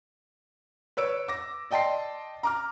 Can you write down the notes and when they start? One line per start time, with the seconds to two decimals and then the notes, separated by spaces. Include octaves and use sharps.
0.97 B4 C#5 E6 D7
1.28 D6 A#6
1.71 D5 D#5 G5 A5 C6 C7
2.43 A#5 D6 F6